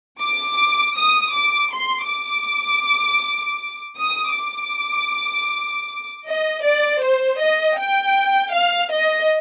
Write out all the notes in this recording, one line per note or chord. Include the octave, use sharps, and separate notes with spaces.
D6
D#6
D6
C6
D6
D#6
D6
D#5
D5
C5
D#5
G5
F5
D#5